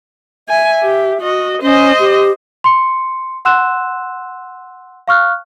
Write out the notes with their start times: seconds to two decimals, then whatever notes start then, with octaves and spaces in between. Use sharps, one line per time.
0.49 E5 G#5
0.83 G4
1.21 F#4 D#5
1.62 C#4 C5 D#5
2.00 G4
2.64 C6 C#7
3.45 F#5 C6 E6 F#6 E7
5.08 F5 C#6 F6 F#6